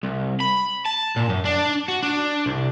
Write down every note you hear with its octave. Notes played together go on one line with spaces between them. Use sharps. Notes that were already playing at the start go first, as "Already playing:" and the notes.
C2
B5
A5
A#2
F#2
D4
F#4
D4
C2